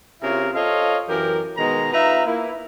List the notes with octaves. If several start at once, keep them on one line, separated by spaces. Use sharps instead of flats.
C3 C#4 E4 F4 G#4 A#4
F4 A4 C5 C#5 D#5 F5
F#2 E3 G4 A#4
B2 D#3 G#3 B3 G#4 A#5
D#4 F4 B4 E5 F5 A#5
A#3 E4